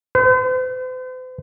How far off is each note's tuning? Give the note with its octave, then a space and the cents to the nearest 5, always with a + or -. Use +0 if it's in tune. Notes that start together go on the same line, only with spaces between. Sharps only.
C5 -45